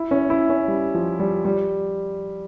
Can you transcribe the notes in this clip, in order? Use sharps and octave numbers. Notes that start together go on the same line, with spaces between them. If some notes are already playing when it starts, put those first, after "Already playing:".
Already playing: E4
C#4
E4
C#4
G3
F3
G3
G3